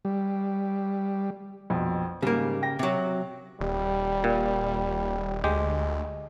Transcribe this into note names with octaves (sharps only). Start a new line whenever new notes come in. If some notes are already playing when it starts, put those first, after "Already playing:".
G3
A#1 F2 B2
G#2 C#3 G3 A#3
G5 A#6
C3 F#3
D#1 G3
A#2
D2 G#3 G4